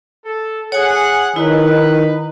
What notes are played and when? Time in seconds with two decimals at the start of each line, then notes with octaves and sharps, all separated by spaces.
0.25 A4
0.72 G#4 C#5 F#5 G#5
1.36 D#3 D#4 E4 B4